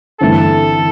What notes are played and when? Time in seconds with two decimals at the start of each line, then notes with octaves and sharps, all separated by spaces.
0.21 G1 G2 E3 A3 C4 A4
0.77 E3